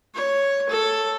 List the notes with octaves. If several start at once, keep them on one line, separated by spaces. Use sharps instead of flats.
C#5
A4